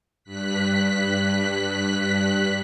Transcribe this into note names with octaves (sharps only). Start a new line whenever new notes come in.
G2 F#6 B6